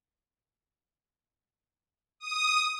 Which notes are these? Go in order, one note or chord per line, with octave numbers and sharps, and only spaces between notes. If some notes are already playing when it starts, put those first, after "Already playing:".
D#6